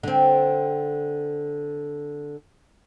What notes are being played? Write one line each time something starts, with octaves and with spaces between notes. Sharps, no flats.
D3 C4